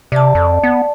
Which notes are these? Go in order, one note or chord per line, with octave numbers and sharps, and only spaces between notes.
C3 D5 A5
F2
B3